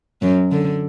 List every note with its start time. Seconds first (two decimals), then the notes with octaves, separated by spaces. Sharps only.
0.22 F#2 F#3
0.51 D3